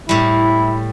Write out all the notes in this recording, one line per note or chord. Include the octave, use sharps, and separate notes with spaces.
A2 G3 E4